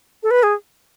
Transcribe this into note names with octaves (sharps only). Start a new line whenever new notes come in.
A4
B4
G#4